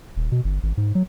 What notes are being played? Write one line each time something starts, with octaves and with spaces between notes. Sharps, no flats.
D#1
B2
G1
G#1
G#2
F#3